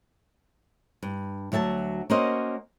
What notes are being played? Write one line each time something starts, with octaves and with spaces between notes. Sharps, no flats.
G2
D2 F#3 E5 G#5 A5
A#3 C#4 F#4 C5 C#5 D#5